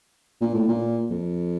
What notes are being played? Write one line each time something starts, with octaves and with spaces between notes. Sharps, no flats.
A#2
A2
A#2
F2